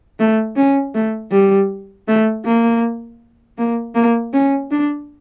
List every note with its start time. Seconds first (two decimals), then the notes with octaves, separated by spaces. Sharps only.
0.20 A3
0.56 C#4
0.95 A3
1.32 G3
2.08 A3
2.45 A#3
3.58 A#3
3.95 A#3
4.33 C#4
4.71 D4